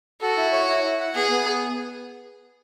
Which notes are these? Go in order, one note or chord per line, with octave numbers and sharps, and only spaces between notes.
F#4 A4
E4
C#5
E4
E4
F#5
B3 G#4
B3